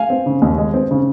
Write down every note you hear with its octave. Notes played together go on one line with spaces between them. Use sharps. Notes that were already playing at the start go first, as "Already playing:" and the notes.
Already playing: F5 G#5
C4
C#3
D#2
G#3
C4
C#3